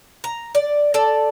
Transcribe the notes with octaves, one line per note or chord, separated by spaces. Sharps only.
A#5
D5
A4 D5